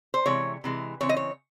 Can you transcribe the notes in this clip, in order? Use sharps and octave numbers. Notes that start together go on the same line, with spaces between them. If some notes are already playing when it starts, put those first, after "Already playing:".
C5
C3 E3 G#3 C#5
C3 E3 G#3
C#3 E3 C4 C#5
D#5
C#5